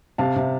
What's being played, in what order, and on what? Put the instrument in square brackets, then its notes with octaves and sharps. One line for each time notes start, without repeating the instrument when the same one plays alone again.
[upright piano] C3 F5 A5
C3